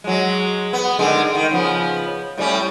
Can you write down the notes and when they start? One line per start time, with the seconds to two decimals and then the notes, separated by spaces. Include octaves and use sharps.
0.04 F#3 G#3
0.73 B3
0.99 D3 D#3 G#3
1.35 D#3
1.51 C#3 F3 B3
2.38 A2 G3 C#4